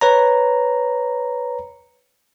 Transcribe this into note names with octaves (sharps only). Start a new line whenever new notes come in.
B4 C#5 A#5